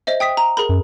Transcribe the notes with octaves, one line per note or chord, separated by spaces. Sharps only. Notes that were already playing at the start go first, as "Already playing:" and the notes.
C5 D#5 E5
G5 D#6 B6
A#5
G#4 A#4 B5
F#2